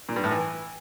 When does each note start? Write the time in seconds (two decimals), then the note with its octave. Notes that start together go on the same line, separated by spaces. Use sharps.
0.09 A#2
0.16 G2
0.24 A2
0.31 E3